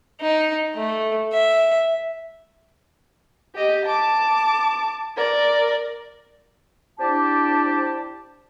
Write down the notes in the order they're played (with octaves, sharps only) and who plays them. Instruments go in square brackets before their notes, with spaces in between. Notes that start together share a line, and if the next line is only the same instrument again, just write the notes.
[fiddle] D#4
A3
E5
[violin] G4 D#5
A5 D6
A#4 D5
[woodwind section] C4 D4 E4 G4 D5 A5